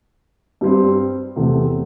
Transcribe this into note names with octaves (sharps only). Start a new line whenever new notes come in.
G2 G3 C4 G4
E2 C3 A3 C4